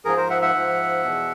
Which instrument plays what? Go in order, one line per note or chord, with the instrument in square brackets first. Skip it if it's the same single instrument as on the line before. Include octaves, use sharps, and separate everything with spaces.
[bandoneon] G#2 F3 G#4 A#4
A#4 C5
E5 F#5
E5 F#5
G#2 F3
E2 B2